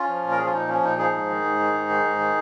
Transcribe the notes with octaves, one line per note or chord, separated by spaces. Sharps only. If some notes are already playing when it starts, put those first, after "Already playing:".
Already playing: C#4 F4
F3
A#2
A#4
F3 G#4
F4
A#2 D#4
F3 C#4
A#2 D#4
F3 D#4 G#4
G#2
D#3
G#2
D#3
G#2
D#3
G#2
D#3